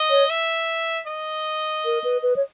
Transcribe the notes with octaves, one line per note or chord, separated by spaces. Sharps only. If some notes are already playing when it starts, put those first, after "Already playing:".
Already playing: D#5
C#5
E5
D#5
A#4
B4
B4
C#5